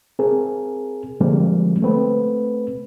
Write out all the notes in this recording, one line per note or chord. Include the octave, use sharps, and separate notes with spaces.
C4 G#4 A#4
D3 F3 G3 G#3 A#3 C4
A3 C4 B4